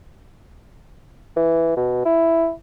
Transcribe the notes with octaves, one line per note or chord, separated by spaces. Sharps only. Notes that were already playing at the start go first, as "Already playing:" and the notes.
E3
B2
E4